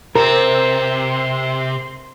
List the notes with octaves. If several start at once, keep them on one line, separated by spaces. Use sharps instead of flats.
C3 C4 A#4 C6